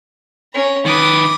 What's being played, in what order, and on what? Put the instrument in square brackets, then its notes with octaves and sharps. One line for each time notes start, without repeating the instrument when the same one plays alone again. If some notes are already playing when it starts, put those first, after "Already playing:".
[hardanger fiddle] C#4 A#5
[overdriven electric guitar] D#3 B4 [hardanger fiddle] D6 D#6